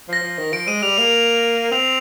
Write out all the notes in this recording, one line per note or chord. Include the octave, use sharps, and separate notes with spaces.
F3 A#6
F3
D#3
F3 D7
G#3 D#7
G3 F7
A#3 F7
C4 F7